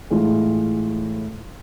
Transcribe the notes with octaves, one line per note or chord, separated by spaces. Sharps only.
A2 E3 G#3 F4